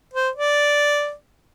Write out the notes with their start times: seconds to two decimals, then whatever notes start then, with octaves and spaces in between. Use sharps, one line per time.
0.13 C5
0.36 D5